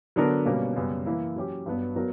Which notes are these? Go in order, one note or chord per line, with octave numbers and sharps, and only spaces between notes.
D3 F#3 B3 D4 A#4
B2 G3 A#3 C#4
F#2 C#3 G3 B3
E3 A#3 E4
F#3 C#4 G4
G2 F#3 B3
F#3 B3 F#4 A#4